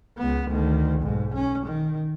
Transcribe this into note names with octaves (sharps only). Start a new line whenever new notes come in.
C#2 B3
D2 D#3
B1 G#2
C#4
D#3